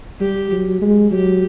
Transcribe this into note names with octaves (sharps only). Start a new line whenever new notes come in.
G3 G4
F#3
G#3
F#3 G4